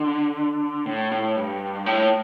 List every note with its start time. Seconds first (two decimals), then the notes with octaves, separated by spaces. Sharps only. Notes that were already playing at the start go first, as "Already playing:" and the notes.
Already playing: D3
0.86 A2
1.12 A2
1.36 G2
1.86 A2